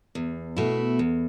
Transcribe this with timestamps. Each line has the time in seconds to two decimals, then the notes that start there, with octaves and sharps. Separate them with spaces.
0.15 E2
0.57 B2 A3 E4
0.99 E2